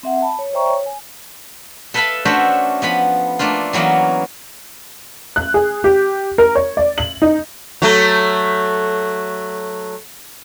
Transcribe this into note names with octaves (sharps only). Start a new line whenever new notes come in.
C4 E5 F#5
A5 B5
C#5
C5 D5 E5 G5 A#5 C#6
C#5
G#5
A4 B4 E5 F5 A5 B5
A3 C#4 D4 F#4 C5 E5
F3 B3 B5
A3 A#3 D4 F4
E3 F#3 A#3 B3 C#4
F#6
G#4
G4
A#4
C#5
D5
F#7
D#4
F#3 A3